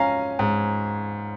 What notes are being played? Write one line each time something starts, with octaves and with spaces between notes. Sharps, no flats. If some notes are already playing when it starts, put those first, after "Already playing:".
Already playing: G#2 F3 C#4 F5 G#5 A#5
G#2